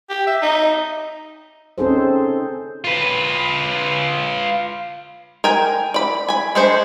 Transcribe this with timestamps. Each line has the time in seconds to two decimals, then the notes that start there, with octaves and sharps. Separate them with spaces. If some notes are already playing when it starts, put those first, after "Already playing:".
0.10 G4
0.27 E5
0.42 D#4
1.78 C4 C#4 D#4 G#4 A4 C5
2.84 F4 B4
5.44 A#4 G5 G#5
5.94 D5 B5
6.29 G#5 B5
6.55 G#3 A3 D4 G#4 C5